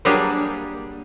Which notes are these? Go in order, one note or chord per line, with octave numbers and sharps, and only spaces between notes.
F#3 G3 A#3 D4 G4 G#4